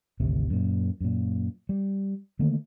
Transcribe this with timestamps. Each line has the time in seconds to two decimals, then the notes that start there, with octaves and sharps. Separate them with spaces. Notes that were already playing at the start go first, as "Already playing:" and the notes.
0.20 G#1 D2 C3
0.50 F#2 A#2
1.01 F#2 A#2
1.69 G3
2.39 D3 D#3 A3 A#3